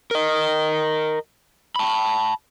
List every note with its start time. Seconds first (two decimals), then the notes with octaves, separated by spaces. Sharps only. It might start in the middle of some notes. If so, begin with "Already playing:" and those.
0.11 A#4 D#5
1.76 A5 B5